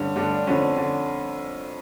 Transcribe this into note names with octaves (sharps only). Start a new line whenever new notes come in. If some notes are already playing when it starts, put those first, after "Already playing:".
Already playing: G2 D3 C#4
G2 D3 D4
D4
F2 D3 C#4
D3